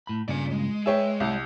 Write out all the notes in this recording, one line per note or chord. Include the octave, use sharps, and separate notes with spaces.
A2 B5
G2 A#2 C#3 D5 G#5
G#3
G#4 B4 C#5 E5 G5
C2 G4 C#5